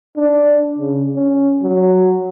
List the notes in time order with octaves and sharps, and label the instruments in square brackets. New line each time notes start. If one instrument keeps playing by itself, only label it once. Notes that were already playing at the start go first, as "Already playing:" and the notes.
[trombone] D4
C#3
C#4
F#3